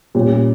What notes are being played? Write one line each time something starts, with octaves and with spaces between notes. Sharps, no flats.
A#2 G3 C#4